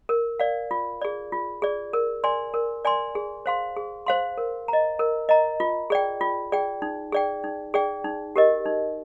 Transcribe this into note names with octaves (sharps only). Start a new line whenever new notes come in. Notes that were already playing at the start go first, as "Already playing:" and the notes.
A#4
D5 F5
F4
G#4 D5
F4
G#4 D5
A#4
D5 G#5 C6
A#4
D5 G#5 C6
G#4
C5 F5 C6
G#4
C5 F5 C6
A#4
D#5 A#5
A#4
D#5 A#5
F4
G#4 D5 G5
F4
G#4 D5 G5
D#4
G#4 D5 G5
D#4
G#4 D5 G5
D#4
G4 A#4 D#5
D#4